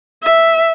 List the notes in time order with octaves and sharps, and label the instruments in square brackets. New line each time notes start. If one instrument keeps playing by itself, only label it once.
[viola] E5